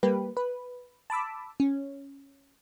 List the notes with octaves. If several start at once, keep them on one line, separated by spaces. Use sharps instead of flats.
G3 A#3 G4 B4
B4
A5 B5 D6 E6
C#4